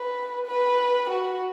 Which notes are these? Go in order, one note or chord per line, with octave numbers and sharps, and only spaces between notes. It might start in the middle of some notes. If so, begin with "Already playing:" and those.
Already playing: B4
B4
F#4